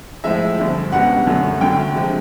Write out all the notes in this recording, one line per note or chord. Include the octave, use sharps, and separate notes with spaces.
A2 F3 G#3 E5
G2 D3 F3
C#2 B2 G3 F#5
F#2 D3 F#3 A3
D2 D3 F#3 A3 G5
C3 F3 G#3